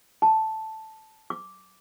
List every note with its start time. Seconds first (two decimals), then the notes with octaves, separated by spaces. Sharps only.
0.22 A5
1.30 D6